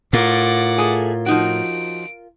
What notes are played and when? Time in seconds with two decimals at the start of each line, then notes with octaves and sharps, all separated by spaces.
0.13 A2 F4 A#4 F#5 D6
0.78 A3 G#4
1.26 F3 D#4 F#4 D7